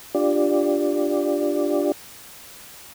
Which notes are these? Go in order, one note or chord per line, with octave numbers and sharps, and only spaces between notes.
D4 F4 G4 D5